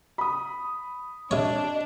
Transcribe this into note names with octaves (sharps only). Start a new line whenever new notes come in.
B5 D#6
C3 D4 C#5 D#5